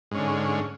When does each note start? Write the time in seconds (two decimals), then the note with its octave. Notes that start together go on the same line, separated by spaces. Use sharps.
0.11 G#2
0.15 C#4
0.18 D3